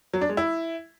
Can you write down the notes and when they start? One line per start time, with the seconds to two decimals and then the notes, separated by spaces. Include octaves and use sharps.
0.14 F#3
0.21 D4
0.29 G#3
0.37 E4